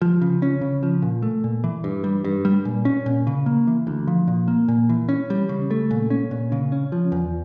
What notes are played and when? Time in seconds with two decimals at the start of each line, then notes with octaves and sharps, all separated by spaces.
0.02 F3
0.22 C#3
0.42 C#4
0.61 C#3
0.83 F3
1.02 A#2
1.22 A3
1.44 A#2
1.64 E3
1.84 G2
2.04 G3
2.25 G2
2.45 G3
2.65 A#2
2.85 C#4
3.06 A#2
3.27 C#3
3.46 A#3
3.67 E3
3.87 D2
4.07 F3
4.28 A#2
4.48 A#3
4.68 A#2
4.89 E3
5.09 C#4
5.30 G3
5.49 C#3
5.71 A3
5.91 A#2
6.10 C#4
6.31 A#2
6.52 C#3
6.72 C#4
6.92 F3
7.12 E2